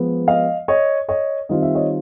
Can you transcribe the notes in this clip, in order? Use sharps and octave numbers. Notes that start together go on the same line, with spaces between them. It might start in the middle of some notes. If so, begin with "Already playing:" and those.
Already playing: F3 G#3 B3
D#5 F5
C#5 D#5
C#5 D#5
D#3 G3 C4 F4 D#5
E5
C#5 D#5